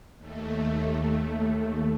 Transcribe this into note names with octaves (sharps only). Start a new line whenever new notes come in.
D#2 A3